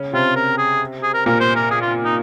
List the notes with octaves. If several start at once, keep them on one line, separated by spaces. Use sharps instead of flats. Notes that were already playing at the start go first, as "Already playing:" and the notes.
Already playing: C#3 C#4
C3 C4 F4
A#4
G#4
G#4
A#4
A#2 A#3 A#4
C5
A#4
G#4
F4
D#4